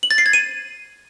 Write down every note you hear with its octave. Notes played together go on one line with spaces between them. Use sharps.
F#7
A6
C7
G#6
D#7